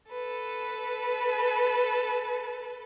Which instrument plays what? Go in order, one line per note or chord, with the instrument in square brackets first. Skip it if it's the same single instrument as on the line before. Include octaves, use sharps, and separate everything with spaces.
[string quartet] A4 B4